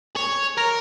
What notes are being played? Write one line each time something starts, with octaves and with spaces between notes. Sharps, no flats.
C#5
A#4